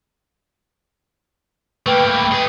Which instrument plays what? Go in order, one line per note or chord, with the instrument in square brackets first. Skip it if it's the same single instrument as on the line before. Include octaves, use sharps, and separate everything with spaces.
[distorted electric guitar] A3 A#3 [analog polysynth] B4 G5
[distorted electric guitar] A3 G#4